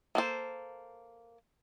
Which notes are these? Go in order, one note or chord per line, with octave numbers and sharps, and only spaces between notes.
A#3 A4 C5